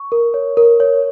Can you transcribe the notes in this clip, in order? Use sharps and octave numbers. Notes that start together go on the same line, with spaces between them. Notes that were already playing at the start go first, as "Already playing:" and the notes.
Already playing: C#6
A#4
C#5
A#4
C#5